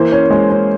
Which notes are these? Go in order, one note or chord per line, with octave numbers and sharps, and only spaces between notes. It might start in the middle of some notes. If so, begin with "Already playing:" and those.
Already playing: E3 A#3 C5
C#4
G#3
C#4